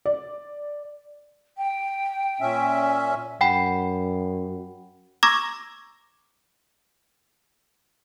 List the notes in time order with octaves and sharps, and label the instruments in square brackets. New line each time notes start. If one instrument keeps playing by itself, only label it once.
[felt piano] D5
[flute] G5
[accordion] A#2 C#4 E5
[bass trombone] F#2 [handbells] F#5 G5 B5
[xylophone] A#5 C#6 D6 E6 G#6 A#6